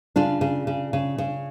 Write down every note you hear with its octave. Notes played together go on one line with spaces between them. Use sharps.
C#3 D4 F4
C#3
C#3
C#3
C#3